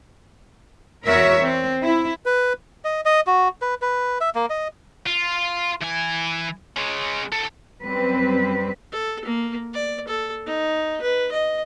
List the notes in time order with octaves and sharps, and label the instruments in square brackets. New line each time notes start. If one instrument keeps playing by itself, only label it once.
[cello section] E2 F#4 A#4 C#5 E5
C4
E4
[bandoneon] B4
[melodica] D#5
D#5
F#4
B4
B4
E5
A#3
D#5
[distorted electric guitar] F4
E3 G#5
G#3 C#4
C2 A4
[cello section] F#2 G3 C4 B4
[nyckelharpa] A4
A#3
D5
A4
D#4
B4
D#5